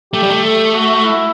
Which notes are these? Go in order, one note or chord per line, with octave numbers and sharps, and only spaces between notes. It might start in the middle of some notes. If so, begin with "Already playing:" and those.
A3 G4
G3
A3
A4
F#4
E4